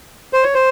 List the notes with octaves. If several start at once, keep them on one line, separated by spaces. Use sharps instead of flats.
C5
C#5
C5